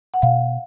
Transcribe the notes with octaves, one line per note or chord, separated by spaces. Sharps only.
F#5
B2 F5